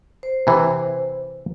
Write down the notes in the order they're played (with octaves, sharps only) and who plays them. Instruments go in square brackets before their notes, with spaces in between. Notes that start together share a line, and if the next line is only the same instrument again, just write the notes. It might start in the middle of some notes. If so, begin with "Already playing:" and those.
[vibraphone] C5
[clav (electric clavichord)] C3 E3